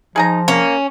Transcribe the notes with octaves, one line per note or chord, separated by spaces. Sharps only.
F3 D#4 G#4 G#5 A#5
A#3 C#4